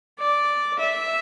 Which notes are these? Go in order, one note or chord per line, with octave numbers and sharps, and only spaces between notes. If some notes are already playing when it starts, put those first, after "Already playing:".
D5
E5